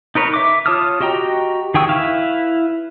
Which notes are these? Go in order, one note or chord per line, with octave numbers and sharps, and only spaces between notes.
D#4 A#4 B4 C#5
E5 D6
F4 C#5 A5 D#6 F6
F#4 G4 D#5 G5 A#5
D#3 G#4 G5 C#6 E6
E4 B4 E5 F5